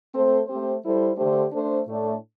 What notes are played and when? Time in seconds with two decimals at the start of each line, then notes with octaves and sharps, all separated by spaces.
0.12 A3 C4 A4 C5
0.47 A3 C4 G4 C5
0.81 G3 E4 A4 C5
1.17 D3 A3 D4 G4 C5
1.52 A3 D4 A4 C5
1.87 A2 A3 D4